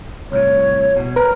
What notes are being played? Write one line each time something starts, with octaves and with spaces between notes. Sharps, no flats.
C2 A2 C#5
B2
A#4 B4